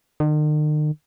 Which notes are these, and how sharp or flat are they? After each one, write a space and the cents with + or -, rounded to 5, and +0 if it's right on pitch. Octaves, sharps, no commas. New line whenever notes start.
D#3 -45